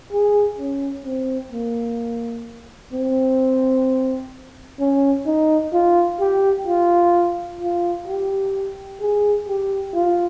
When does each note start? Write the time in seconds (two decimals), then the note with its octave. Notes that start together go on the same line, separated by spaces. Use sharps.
0.12 G#4
0.59 C#4
1.05 C4
1.52 A#3
2.93 C4
4.80 C#4
5.26 D#4
5.73 F4
6.20 G4
6.67 F4
7.61 F4
8.08 G4
9.01 G#4
9.48 G4
9.94 F4